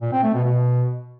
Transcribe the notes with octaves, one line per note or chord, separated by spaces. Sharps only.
A#2
C4
A3
B2
B2